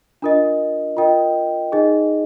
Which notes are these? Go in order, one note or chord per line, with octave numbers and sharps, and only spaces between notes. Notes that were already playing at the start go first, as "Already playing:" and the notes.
D4 F4 A#4 D#5
F4 A#4 D#5 G5
D#4 G#4 D#5